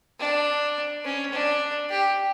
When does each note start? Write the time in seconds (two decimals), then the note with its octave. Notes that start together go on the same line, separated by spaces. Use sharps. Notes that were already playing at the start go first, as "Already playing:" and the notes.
0.19 D4
1.05 C#4
1.32 D4
1.90 G4